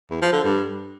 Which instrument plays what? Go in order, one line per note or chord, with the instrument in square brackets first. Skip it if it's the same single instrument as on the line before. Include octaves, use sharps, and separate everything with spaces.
[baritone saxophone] E2
F3
D3
G2